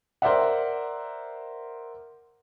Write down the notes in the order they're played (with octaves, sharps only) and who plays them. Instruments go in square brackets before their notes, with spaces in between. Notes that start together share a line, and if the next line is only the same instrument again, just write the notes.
[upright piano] A#4 C5 D5 E5 F#5